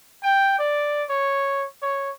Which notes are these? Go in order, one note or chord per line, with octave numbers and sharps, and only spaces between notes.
G5
D5
C#5
C#5